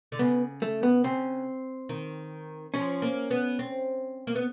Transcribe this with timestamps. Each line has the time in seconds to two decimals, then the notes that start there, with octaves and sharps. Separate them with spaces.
0.12 D3
0.19 C#3 B3
0.62 A3
0.83 B3
1.04 C#3 C4
1.89 D#3
2.74 F3 C#4
3.02 A#3
3.31 B3
3.59 C4
4.27 A#3
4.35 B3